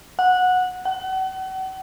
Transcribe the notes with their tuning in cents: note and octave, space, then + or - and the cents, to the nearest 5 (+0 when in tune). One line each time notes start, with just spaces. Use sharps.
F#5 -15
F#5 +35